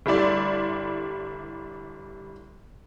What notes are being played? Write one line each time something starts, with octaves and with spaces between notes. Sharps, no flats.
G1 G3 A3 E4 D5 C6